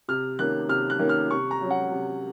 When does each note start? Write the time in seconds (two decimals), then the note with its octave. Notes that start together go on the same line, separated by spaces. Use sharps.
0.08 C3 F6
0.39 D#3 A#3 C#4 F#6
0.69 C3 F6
0.90 F#6
0.99 D#3 A#3 C#4
1.09 F6
1.31 C3 C#6
1.51 A#5
1.61 F#3 C#4
1.71 F#5
1.92 C3